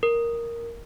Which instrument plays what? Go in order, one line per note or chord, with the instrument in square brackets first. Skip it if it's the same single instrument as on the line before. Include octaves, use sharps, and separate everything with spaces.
[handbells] A#4